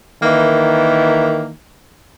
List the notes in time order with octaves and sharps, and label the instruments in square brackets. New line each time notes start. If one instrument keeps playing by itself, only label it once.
[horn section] D#3 E3 A#3